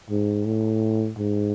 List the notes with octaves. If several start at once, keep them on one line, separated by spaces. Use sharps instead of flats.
G#2
A2
G#2